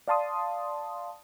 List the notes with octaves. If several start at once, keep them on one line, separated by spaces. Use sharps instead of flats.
D5 F5 A5 C6 D#6